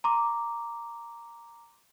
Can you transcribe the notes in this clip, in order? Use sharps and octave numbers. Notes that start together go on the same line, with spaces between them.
A#5 C6 D6